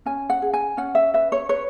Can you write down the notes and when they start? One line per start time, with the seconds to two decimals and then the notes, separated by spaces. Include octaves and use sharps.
0.06 C#4 G#5
0.30 F#5
0.42 G#4
0.53 G#5
0.77 C#4 F#5
0.95 E5
1.14 B4 E5
1.32 C#5
1.49 B4 C#5